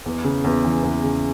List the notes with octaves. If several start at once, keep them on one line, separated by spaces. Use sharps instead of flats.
E2
C#3
E2
E3
E2
C#3